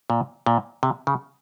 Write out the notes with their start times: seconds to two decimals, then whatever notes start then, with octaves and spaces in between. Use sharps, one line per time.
0.10 A#2
0.46 A#2
0.83 C3
1.07 C#3